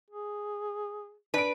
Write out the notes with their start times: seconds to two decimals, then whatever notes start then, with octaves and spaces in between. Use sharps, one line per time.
0.10 G#4
1.34 D4 B4 D7